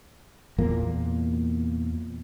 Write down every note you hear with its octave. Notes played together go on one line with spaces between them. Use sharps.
E2 A#2 A#3